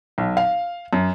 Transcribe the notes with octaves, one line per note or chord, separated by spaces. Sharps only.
B1
F5
F#2